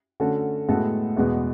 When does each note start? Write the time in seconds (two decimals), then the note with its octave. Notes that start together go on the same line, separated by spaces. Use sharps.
0.20 D3 A3 C#4 F#4 A4
0.69 A2 G#3 B3 F#4 A4
1.17 E2 B2 G#3 B3